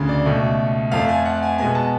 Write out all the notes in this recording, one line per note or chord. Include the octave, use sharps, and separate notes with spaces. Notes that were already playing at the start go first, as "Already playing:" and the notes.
Already playing: D2 C#3
D5
C#2 B2 A3
F2 F3 A3 F5
G#5
F#5
G#5
B2 G#3 B3 G#5
A5